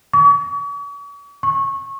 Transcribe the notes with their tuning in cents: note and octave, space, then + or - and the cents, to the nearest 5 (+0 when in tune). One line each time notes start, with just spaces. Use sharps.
C#6 +45
C#6 -20